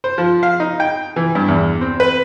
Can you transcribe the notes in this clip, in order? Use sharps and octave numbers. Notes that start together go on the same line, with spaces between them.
C5
F3
F5
D#4
G5
E3
G2
E2
C4
B4